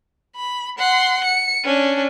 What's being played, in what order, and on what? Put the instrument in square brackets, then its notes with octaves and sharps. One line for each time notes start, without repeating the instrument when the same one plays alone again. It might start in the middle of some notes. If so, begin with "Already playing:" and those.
[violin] B5
F#5 C6
C#7
C#4 D4